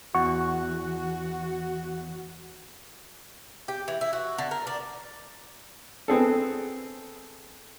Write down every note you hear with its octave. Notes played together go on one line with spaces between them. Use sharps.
E2 F#4 F#5 C#6
G4
E3
E4
F#4
D3
A#4
D4
B3 C4 G#4 A4